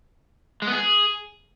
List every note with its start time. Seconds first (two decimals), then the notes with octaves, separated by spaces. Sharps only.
0.62 G#3
0.67 B3
0.72 G#4